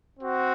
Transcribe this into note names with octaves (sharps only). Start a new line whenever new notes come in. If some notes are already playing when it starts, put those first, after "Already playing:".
C4 F#4